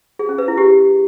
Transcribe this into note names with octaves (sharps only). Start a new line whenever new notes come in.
G#4
C#4
B4
E4
G4